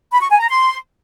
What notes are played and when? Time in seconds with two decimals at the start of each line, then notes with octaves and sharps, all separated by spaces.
0.12 B5
0.21 C#6
0.30 G#5
0.39 A#5
0.48 C6